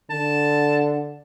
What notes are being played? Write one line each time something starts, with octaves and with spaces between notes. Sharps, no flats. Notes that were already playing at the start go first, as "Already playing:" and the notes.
D3 A5